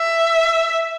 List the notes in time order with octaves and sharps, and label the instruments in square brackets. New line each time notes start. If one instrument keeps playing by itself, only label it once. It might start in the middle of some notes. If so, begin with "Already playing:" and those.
Already playing: [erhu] E5